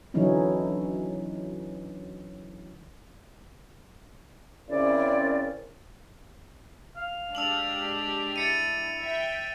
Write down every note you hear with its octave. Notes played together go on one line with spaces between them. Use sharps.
D3 E3 F#3 C#4 D#4 E4
C#3 C4 C#4 E4 A#4 D5
F5
G#3 D4 G4 E6 F7 F#7
E4 A6 C#7 D#7
E5 G5